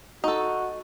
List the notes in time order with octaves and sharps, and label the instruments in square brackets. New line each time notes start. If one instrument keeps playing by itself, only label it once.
[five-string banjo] D#4 A4 [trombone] F#4